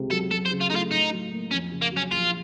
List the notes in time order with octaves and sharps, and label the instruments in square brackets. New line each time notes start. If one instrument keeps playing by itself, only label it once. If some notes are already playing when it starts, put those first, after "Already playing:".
Already playing: [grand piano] C#2 C3
[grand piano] F#3 [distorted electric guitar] A4
[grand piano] F#2 [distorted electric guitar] A4
[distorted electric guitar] C5
[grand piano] C#3
[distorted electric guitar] F4
[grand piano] A3 [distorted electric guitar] D#4
[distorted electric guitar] F4
[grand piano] A2 [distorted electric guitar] D#4
[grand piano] F#3
A#3
[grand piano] F2 [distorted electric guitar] C#4
[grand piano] C#3
[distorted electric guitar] A#3
[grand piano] F#3
[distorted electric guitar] C#4
[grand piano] A#1 [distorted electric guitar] F4